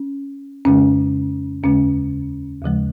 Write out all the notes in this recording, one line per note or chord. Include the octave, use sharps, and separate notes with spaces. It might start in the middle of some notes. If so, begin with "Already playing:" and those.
Already playing: C#4
F2 C#3 G#3 C#4
D#2 C#3 G#3 C#4
D#2 C#3 F3 G#3